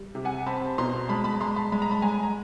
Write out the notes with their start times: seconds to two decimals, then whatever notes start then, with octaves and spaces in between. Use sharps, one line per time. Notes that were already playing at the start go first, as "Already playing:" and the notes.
Already playing: G3
0.15 C3
0.25 F#5 G#5
0.46 C4 A5 B5
0.78 B2 A#5 C6
1.09 G#3 A5 B5
1.24 A5 B5
1.40 G#3 A#5 C6
1.56 A5 B5
1.72 G#3 B5
1.82 A#5
1.91 A5 B5
2.02 G#3 G#5 A#5
2.23 A#5